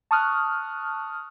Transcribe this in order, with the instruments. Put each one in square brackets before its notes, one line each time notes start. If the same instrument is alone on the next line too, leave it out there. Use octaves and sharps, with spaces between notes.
[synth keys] A5 C#6 D#6 F6 F#6